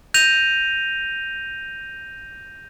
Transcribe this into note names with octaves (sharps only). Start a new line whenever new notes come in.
G6 A#6 D#7 F7